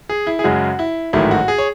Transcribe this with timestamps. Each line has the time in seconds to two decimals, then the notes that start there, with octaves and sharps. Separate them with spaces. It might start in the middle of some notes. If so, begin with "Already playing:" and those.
0.09 G#4
0.27 E4
0.39 G#4
0.44 F#2 C#3 G#3 F#4
0.79 E4
1.13 A1 G#2 D#3 F#3 A3 E4
1.31 F#4
1.48 G#4
1.58 C#5